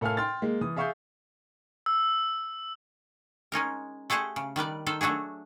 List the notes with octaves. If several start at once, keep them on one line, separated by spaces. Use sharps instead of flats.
A2 A4 A#4 F5 G#5 F6
G5 C6 F6 A6
G#3 A#3
E3 D#6
G#4 E5 F5 C#6 D#6 G6
E6
G#3 C#4 D#4 A#4
A3 G4 G#4 C5 F#5
C#3
D#3 G3 B4 D5
D#3 A4 C5
F#3 A3 D4 F#4 G#4